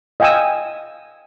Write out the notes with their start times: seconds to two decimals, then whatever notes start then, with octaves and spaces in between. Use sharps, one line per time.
0.20 D#5 F5 G5 G#5 D#6 E6